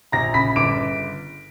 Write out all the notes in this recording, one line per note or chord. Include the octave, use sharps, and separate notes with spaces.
A#1 A#5 A#6
C#3 B5 B6
G1 D6 D7